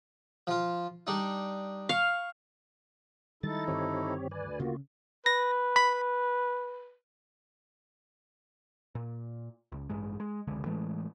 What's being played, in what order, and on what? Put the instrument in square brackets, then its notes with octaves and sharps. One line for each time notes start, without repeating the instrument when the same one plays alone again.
[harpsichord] F3 F4
G3 D4 D#4
[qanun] F5 [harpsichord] C#6
[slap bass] D#3 G3 G#3 [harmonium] D#4 E4 A4 [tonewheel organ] A6
[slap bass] G2 D3 D#3 [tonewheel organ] C4 G4 C#5
[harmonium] D2 [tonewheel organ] B4 D5 G#5
[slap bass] C#3 [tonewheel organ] A#3 F4 F#4
[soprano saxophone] B4 [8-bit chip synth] A#6
[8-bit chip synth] B5
[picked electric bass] A#2
C#2
A1 G2 G#3
G#3
F1 C#2 D3 G#3
A2 E3 G#3 A3